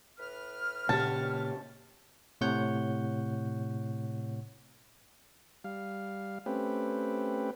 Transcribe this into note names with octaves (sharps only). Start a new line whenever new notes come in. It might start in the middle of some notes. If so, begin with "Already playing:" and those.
A2 B4 F6
A#2 C#3 A#3 G4 C#5 A5
A2 C3 C#5 F#5 G6
G3 F5
A3 C4 C#4 G4 B4